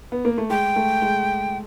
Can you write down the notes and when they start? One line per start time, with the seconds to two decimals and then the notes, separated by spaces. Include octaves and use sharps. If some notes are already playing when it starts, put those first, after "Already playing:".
0.12 B3
0.25 A#3
0.38 A3
0.50 G#3 G5
0.76 A3
1.02 G#3